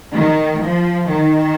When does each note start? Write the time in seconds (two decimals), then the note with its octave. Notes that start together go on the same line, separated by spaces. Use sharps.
0.13 D#3
0.62 F3
1.10 D#3